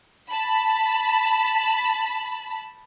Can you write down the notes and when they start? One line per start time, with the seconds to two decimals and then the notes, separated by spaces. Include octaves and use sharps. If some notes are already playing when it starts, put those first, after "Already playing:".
0.30 A5 B5